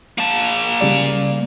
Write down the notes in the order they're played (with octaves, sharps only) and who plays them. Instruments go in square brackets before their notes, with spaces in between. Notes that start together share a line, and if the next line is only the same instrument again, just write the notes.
[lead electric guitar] A#3 A5
[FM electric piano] C#3 G3 D5